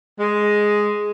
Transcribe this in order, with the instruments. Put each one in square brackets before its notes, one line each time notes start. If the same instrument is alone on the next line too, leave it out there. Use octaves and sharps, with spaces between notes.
[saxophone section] G#3